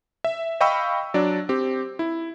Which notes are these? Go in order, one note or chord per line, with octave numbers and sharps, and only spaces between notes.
E5
D#5 F5 G5 B5 C#6 E6
F#3 D4 D5
C4 G4
E4